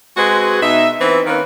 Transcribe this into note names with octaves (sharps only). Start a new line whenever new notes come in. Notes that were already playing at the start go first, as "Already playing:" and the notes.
G#3 C4 F#4 G#4 B4
B2 D#4 E5
E3 B3 C4 D#4 E4
D#3 A#3 C4 C#4 B4